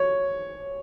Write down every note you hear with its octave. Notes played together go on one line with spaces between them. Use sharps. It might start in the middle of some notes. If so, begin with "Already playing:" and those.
Already playing: C#5